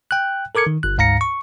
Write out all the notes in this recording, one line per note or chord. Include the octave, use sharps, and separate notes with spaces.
G5 F#6
A4 A#4 D6 G#6 C#7
D#3
G1 F#6
D2 G#2 F5 A#5 A#6 C#7
C#6